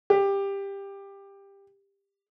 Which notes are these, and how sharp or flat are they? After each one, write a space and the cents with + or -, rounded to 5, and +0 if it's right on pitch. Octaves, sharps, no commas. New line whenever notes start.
G4 +15